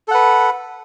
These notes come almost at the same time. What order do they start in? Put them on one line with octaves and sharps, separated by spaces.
A4 F#5 B4